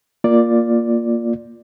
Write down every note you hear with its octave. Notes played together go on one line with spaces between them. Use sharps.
A#3 F4 D5